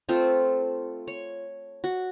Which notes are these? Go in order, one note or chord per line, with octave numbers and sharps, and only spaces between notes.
A3 C4 F4
C#5
F#4